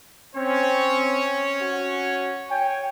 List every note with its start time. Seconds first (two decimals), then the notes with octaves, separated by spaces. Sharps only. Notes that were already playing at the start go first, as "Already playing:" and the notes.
0.36 C4 C#4 C#5
1.61 F#4
2.50 C#5 G5 G#5